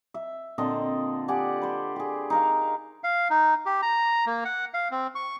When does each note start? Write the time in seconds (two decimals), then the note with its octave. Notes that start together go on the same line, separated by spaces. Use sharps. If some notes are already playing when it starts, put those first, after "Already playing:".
0.14 E5
0.58 A#2 D3 C4 D#5
1.28 G4 D5 F#5 G#5
1.62 B4 C5
1.96 G4 G#4
2.30 D#4 A#4 F5
3.04 F5
3.30 D#4
3.66 G4
3.82 A#5
4.26 A#3
4.45 F#5
4.74 F5
4.91 C4
5.15 C#6